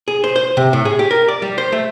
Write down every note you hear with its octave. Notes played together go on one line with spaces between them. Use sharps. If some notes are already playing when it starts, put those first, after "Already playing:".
G#4
C5
C5
C3
A2
G#4
G4
A#4
D5
G3
C5
A3